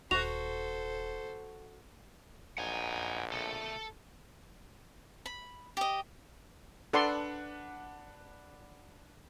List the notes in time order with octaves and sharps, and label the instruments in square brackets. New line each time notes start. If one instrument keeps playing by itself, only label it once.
[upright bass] D#1 [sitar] F#4 [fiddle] A4 C5 [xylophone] F7
[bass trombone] A#1 [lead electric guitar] D#4 [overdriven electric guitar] F#5 G#5
[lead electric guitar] B2 A3 [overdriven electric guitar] A4
[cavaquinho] B5
G4 D#5
[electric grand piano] D4 B4 F#5 [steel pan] A4 D5 C6